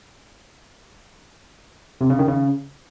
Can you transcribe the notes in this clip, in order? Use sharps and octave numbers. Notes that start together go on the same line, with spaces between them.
C3
C#3
D#3
C#3